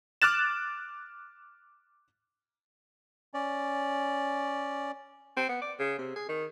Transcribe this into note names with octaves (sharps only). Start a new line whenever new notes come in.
D6 F6 F#6 A6 E7
C#4 D5
C4
B3
D5
C#3
C3
G#4
D#3